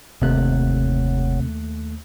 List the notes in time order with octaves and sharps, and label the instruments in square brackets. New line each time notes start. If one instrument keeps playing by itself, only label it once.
[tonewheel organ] F#1 [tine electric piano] D#2 A3 F#6 [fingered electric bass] C3